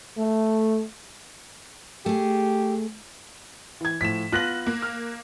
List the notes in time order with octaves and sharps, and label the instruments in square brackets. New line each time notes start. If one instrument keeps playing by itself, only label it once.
[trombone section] A3
[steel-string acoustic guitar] A3 G#4 [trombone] G4
[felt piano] E3 G#6
[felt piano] A2 F3 [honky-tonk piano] B6 E7
[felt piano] B3 F4 [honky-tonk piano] F#6 A#6 F#7
[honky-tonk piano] A#3
[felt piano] F6